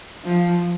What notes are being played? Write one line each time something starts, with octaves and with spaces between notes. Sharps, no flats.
F3